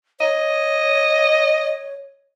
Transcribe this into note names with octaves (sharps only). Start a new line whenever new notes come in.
C#5 D#5